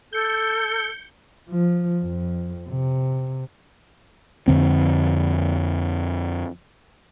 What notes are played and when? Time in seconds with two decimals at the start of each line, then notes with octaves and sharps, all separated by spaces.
0.13 A4 G6 C#7
1.50 F3
2.02 F2
2.69 C3
4.48 F2 D3 C4